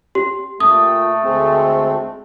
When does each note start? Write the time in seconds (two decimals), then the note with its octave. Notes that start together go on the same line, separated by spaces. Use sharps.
0.15 G4
0.60 A#2 A3 G5 D#6
1.24 D2 G#3 C4